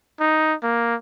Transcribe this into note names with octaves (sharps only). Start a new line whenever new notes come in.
D#4
A#3